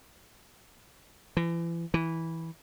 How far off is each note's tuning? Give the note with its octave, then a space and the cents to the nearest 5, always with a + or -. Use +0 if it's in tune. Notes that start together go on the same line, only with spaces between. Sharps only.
E3 +35
E3 -10